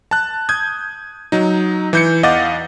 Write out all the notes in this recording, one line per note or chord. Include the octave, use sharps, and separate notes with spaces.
A5 F#6
D#6 G6 G#6
F#3 D#4
E3 G6 C#7
E2 D#5 F5 F#5 D6 A6